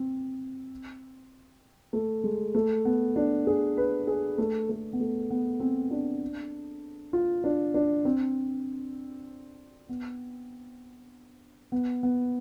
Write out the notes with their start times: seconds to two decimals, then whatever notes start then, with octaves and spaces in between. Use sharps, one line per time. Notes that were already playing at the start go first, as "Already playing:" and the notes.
Already playing: C4
1.93 A3
2.24 G#3
2.55 A3
2.85 B3
3.16 D4
3.47 G#4
3.77 B4
4.07 G#4
4.38 A3
4.69 A3
4.93 B3
5.00 A3
5.30 B3
5.60 C4
5.91 D4
7.13 F4
7.44 D4
7.74 D4
8.05 C4
9.89 B3
11.72 B3
12.03 B3